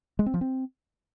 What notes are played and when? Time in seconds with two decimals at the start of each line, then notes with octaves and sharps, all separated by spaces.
0.19 G#3
0.26 C4
0.34 F3
0.41 C4